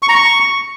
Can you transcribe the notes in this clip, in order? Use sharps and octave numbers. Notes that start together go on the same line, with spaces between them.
C#6
A#5
C#6